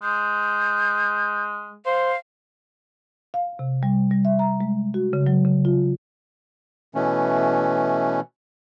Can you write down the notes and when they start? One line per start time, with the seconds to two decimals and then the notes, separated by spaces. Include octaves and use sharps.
0.03 G#3 G6
1.86 C5 F5
3.34 F5
3.59 C3
3.83 G3
4.11 G3
4.25 E5
4.39 A#5
4.61 G#3
4.94 F#4
5.13 C#3
5.27 F#3
5.45 C#3
5.65 F4
6.95 B2 E3 A3 C#4